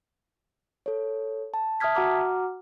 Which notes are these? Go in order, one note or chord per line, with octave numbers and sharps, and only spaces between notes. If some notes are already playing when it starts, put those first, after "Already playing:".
A4 C#5
A5
E5 A5 D#6 F6 G#6 B6
F#4 F#5 A#5 D6 F6